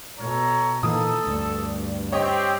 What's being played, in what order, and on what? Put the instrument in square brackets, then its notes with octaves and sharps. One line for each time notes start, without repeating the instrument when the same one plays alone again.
[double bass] B2 [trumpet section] A4 C#5 A#5
[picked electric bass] A#2 E3 A#3 [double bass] D#4 [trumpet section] A4 [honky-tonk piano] D#6
[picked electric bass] D2 [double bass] G2
[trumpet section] C4 G4 [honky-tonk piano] C#5 D#5